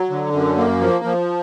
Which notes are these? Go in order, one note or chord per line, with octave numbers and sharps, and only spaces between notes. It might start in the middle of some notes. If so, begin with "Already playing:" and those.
Already playing: F#3
D3
F#2
A#3
F3
F3